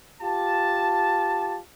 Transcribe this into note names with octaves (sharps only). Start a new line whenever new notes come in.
F4 G4 A5